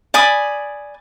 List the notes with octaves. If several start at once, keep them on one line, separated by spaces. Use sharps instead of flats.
D5 G#5 B5 D#6